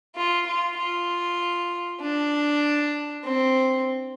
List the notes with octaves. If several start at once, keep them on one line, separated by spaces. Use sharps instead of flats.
F4
F4
F4
D4
C4